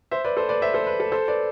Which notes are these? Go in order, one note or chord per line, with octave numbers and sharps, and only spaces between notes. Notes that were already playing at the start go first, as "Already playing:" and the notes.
C5 E5
B4 D5
A4 C5
B4 D5
C5 E5
A4 C5
B4
A4
A4 C5
B4 D5